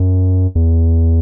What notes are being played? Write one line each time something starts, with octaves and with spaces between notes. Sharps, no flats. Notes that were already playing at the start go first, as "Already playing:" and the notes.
Already playing: F#2
E2